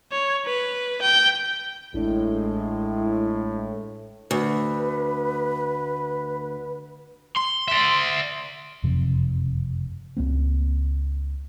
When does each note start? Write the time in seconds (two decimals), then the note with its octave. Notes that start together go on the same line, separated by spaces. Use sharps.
0.12 C#5
0.46 B4
1.01 G5
1.94 A1 A2 G#3 D4 E4
4.31 D2 B4
7.37 C6
7.68 D5 E5
8.83 F#1 F2 C3
10.17 C#2 A#3 C4